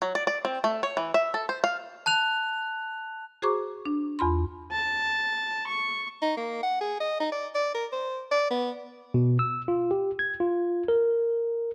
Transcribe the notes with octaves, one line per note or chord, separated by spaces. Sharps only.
F#3
D5
D5
C4
A3
C#5
E3
E5
A4
C5
F5
A5 F#6 F7
F#4 G#4 C5 A#5 C#6 D6
D4
E2 F4 B5 C6
A5
C#6
D#4
A#3
F#5
G#4
D#5
D#4
D5
D5
A#4
C5
D5
B3
B2
E6
F4
G4
G#6
F4
A#4